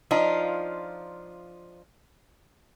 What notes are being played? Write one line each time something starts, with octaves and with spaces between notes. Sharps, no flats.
F3 D4 D#4 F4